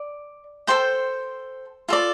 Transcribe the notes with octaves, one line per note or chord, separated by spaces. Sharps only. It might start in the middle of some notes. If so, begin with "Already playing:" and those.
Already playing: D5
A4 C5 G5
F4 A4 D5